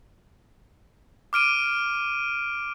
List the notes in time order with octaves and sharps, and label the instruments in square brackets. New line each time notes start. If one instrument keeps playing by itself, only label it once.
[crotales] D6 F6 D7 D#7